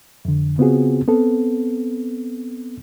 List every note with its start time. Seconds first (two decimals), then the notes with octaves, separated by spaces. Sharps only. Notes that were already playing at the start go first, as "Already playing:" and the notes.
0.25 F2 D3
0.58 C#3 B3 C4 F4 F#4 G#4
1.08 B3 C4 A4